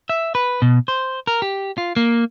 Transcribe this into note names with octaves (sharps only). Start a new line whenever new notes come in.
E5
B4
B2
C5
A#4
G4
F4
A#3